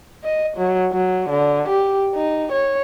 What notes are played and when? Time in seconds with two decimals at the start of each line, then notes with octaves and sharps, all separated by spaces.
0.24 D#5
0.57 F#3
0.92 F#3
1.30 D3
1.68 G4
2.15 D#4
2.52 C#5